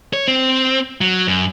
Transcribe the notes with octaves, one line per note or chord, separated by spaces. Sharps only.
C#5
C4
F#3
F#2